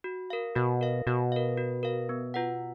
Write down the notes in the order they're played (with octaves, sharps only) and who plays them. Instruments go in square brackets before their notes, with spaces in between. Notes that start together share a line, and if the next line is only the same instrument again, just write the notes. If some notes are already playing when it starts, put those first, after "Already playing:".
[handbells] F#4
A#4 F5
[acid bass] B2 [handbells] F#4
[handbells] A#4 F5
[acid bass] B2 [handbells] F#4
[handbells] A#4 F5
F#4
A#4 F5
B3
F4 B4 F#5